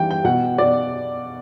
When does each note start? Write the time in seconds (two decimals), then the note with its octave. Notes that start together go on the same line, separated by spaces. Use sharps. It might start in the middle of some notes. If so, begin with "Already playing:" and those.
Already playing: E3 G3 G5
0.11 G5
0.24 B2 F#5
0.58 B2 D5